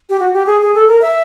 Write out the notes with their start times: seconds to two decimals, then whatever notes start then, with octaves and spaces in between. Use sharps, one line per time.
0.10 G4
0.20 F#4
0.34 G4
0.46 G#4
0.61 G#4
0.75 A4
0.88 A#4
1.02 E5